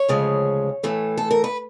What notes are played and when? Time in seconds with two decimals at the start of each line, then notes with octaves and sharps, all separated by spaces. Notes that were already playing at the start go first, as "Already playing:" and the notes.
Already playing: C#5
0.09 D2 C#3 F3 G#3
0.83 A2 E3 A3
1.18 A4
1.31 A#4
1.44 B4